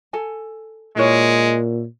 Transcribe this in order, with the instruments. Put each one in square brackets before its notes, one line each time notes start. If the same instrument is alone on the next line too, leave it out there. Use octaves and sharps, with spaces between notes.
[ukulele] A4 G#5
[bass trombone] A#2 [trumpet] G#3 [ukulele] E4 A#4 C#5